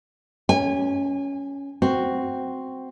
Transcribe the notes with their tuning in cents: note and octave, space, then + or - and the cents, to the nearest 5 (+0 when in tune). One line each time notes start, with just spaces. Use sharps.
C#4 +10 G#5 -30
C4 +0 F#4 +0